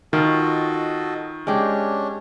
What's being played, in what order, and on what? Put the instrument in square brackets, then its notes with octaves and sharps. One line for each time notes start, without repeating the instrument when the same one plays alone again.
[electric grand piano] D#3 [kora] F4 [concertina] F#4 A4 D#5
[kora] G#3 G4 [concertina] C#4 D4